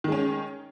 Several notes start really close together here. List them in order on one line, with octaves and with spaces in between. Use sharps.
D#3 G#3 C#4